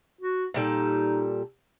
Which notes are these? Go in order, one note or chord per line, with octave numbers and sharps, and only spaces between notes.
F#4
A#2 G3 D#4 A4